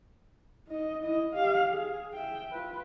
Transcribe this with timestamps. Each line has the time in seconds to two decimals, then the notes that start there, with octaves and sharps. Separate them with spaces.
0.68 D#4 D#5
1.03 E4 D#5
1.34 G4 F5
1.71 G#4
2.13 E5 G5
2.52 F4 B4